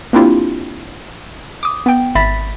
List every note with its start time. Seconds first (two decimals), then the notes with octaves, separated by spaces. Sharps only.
0.13 A#3 C4 D4 E4 F4 G4
1.63 D6 D#6
1.86 B3 G5
2.15 G#1 E5 B5 A6 B6